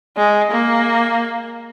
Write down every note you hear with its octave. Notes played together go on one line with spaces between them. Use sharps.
G#3
A#3